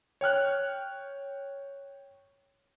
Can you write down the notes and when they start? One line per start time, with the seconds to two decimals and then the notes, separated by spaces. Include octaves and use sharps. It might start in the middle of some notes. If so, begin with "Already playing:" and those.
0.21 C#5 G5 F6 F#6